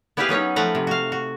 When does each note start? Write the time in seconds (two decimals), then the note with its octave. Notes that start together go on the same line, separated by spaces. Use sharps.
0.17 B3 E4 G4 G#4 B4 F5
0.29 F#3 B3 C#4 D#4
0.56 F3 A3 B4 F#5 A#5
0.75 C3
0.87 F#4 F5
1.12 F#4